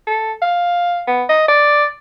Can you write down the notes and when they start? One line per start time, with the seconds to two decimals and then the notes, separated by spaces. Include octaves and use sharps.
0.07 A4
0.42 F5
1.08 B3
1.30 D#5
1.49 D5